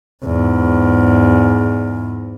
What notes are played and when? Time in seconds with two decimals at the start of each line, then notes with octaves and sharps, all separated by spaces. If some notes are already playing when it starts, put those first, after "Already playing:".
0.25 E2 G#2